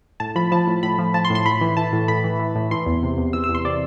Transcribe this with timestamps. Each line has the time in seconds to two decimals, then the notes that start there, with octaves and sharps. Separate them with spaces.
0.20 A2 A5
0.36 F3 B5
0.52 F3 A5
0.67 A2
0.83 A2 B5
0.98 F3
1.14 F3 A5
1.25 C6
1.30 A2
1.35 C6
1.45 A2 B5
1.61 E3
1.77 E3 A5
1.93 A2
2.08 A2 B5
2.24 E3
2.39 E3
2.56 A2
2.71 E3 C6
2.86 E2
3.03 C3
3.18 E2
3.33 E3 E6
3.44 E6
3.49 E2
3.55 C6
3.65 C3 D5